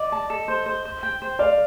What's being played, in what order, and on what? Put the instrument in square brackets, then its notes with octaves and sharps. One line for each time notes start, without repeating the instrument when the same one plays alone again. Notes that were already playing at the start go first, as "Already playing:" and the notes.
Already playing: [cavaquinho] D5 [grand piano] D#5
[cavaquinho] A5
A4
C5
C5
C5
G5
C5
[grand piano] D5 [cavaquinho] F5